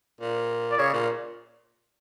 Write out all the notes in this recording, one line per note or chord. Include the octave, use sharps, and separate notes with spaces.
A#2
D5
C#3 C#5
A#2